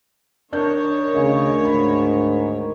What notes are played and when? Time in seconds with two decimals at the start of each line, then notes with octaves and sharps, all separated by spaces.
0.53 D#3 D4 A#4 C#5 G6
1.15 D2 C#3 D#5
1.65 G#2 B5